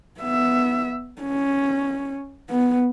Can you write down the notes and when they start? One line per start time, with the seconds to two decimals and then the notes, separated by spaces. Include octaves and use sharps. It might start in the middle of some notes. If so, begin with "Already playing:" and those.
0.20 B3 E5
1.22 C#4
2.50 B3